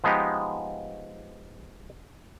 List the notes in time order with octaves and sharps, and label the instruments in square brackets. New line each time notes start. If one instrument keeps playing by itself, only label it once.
[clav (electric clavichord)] F3 G#3 B3 D#4 G4